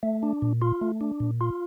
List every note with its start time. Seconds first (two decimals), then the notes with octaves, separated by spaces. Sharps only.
0.03 A3
0.23 D4
0.42 A#2
0.62 F4
0.81 A3
1.01 D4
1.20 A#2
1.41 F4